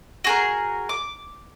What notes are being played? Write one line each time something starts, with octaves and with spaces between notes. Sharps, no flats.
F#4 G#4 A#4
D6